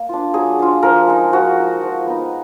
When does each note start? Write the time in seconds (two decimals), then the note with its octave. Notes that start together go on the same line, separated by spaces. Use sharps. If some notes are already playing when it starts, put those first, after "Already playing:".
Already playing: A#3
0.09 D4 F4
0.34 F#3 G#4
0.59 D4 F4
0.83 F3 A#4
1.07 G#3 D#4
1.32 F3 F#4
1.57 G#3 D#4
1.82 F3
2.07 B3 D#4